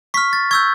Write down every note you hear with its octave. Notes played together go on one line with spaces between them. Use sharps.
C#6 F6 B6
A6
C#6 E6 G6 G#6